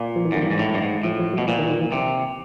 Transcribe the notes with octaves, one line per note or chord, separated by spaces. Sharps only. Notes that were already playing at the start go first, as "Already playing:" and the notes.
Already playing: A#2
F3
E3
F#2 D#3
G2 E3
G#2
A2
G2
G#2
A2 F3
F3
F#3
B2
A#2 F3
D#3
E3
D#3
E3
C3